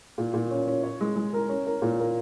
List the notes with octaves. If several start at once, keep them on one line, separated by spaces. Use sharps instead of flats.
A#2
A#2
C#4
C#4
C#5
G#3
G#3
A#4
C#4
A#4
A#2
A#3